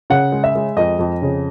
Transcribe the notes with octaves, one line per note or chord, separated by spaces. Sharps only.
C#3 F#5
G#3
E5
G#3
F2 D#5
F2
C#3